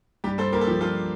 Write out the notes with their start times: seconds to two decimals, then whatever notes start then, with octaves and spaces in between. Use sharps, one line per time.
0.24 G2 G4
0.38 G2 A4 C5
0.52 A#3 G4 A#4
0.61 A4
0.67 F3 G4
0.81 G2 F4 A4